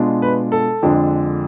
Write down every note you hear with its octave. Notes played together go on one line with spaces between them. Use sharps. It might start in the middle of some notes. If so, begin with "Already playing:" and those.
Already playing: B2 G#3 D4 F4
B4
A4
F2 D3 F3 G#3 D4